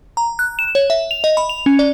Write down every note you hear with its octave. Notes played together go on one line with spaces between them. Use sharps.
A#5
F#6
E7
C#5
E5
F7
D#5
B5
F7
C#4
D5